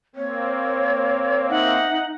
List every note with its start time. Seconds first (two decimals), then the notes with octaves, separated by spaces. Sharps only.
0.16 A#3 C4 C#5
1.50 D#4 E5 F#5